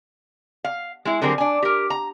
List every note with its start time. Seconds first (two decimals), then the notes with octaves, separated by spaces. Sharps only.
0.64 F5
1.05 G#3 E4
1.21 D3 F#3 G3 C4 G#4 A#4
1.38 D4 G#5
1.63 G4 A#4
1.90 A#5